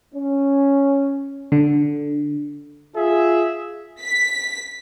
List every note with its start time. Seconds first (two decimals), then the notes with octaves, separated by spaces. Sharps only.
0.14 C#4
1.52 D3
2.96 F4 G#4 E5
4.02 B6